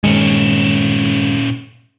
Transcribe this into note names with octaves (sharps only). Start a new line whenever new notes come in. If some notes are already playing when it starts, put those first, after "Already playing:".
G2 A#2 D#3 G#3 C#4